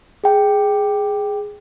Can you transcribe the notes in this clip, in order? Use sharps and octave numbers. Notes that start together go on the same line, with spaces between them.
G#4 G5